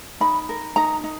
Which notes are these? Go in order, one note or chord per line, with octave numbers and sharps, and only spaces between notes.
D#4 B5
A#4
D#4 A#5
D#4